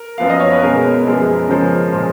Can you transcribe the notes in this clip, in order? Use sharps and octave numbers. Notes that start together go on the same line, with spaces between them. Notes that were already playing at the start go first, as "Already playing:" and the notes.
Already playing: A#4
F#2 F3 B3 F5
D#5
C#5
B4
B2 G#3 C#4 A#4
F#2 F3 G#3 B3
C#3 F3 G#3 C#4 A#4
A#2 F3 G#3 C#4